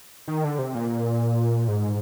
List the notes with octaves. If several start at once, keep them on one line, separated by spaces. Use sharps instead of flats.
D#3
D3
C3
A#2
G#2